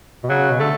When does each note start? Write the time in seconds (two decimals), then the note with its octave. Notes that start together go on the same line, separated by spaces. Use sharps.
0.23 B2
0.29 C#3 F#3
0.50 B2
0.59 D3 A3